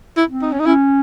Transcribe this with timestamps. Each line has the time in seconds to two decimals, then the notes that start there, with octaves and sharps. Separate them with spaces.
0.17 E4
0.29 C4
0.42 D#4
0.52 C#4
0.59 D#4
0.66 C#4 E4